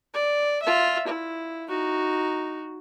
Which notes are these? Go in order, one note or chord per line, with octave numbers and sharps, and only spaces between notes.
D5
F4 E5
E4
D#4 F#4